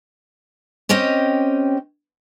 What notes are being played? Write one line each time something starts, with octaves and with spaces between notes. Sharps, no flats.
C4 C#4 G4 D#5 G5